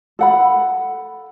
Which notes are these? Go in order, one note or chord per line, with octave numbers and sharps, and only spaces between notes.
A4 F#5 B5